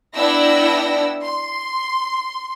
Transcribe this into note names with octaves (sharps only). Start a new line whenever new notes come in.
B3 D4 E4 G5 E6 A#6
C6